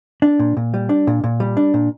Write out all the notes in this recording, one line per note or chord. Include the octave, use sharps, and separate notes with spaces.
D4
A#2
A#2
G3
D4
A#2
A#2
G3
D4
A#2